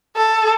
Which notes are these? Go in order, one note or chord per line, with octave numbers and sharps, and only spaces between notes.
A4